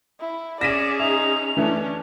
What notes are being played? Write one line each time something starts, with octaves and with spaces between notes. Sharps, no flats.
E4
C#4 G#4 D5 A#6 B6 D#7 E7
D#4 E5 F7
E3 A3 C#4 D4